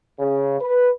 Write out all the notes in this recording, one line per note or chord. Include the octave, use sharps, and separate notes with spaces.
C#3
B4